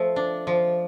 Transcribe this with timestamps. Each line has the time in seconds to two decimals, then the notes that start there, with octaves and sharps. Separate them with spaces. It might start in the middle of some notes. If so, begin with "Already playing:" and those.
Already playing: F3 A3
0.16 D4
0.47 F3